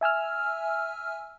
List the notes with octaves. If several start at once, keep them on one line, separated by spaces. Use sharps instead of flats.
E5 G#5 E6 F6